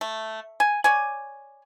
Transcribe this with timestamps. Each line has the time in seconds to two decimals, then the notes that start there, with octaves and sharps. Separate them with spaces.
0.01 A3
0.60 G#5
0.84 C#5 D5 G#5